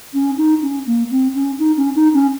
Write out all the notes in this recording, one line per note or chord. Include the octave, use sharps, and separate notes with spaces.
C#4
D#4
C#4
A#3
C4
C#4
D#4
C#4
D#4
C#4